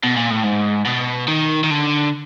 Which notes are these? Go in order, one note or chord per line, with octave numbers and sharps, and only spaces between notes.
B2
A#2
A2
G#2
B2
D#3
D#3
D3